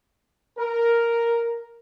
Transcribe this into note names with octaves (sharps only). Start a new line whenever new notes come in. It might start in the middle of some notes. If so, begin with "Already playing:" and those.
A#4